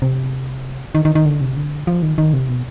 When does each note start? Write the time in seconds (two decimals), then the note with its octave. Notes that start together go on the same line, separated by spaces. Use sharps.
0.02 C3
0.95 D#3
1.05 D#3
1.15 D#3
1.26 D3
1.41 C3
1.56 D3
1.87 F3
2.02 D#3
2.18 D#3
2.33 C3
2.49 B2